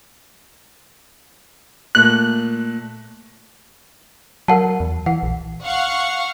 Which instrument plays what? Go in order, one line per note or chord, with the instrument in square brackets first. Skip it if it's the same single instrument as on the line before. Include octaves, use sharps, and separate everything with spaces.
[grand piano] A#2 A3 [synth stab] F#6
[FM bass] F#3 [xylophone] A#4 F#5 A5
[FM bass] E2
[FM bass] E3 [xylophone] F#5
[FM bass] A#1
[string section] F5 F#5 C#6